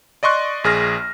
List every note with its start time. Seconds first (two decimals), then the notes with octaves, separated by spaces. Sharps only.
0.23 D5 D#5 C6 C#6 F#6
0.64 A#1 G#4 F6 A#6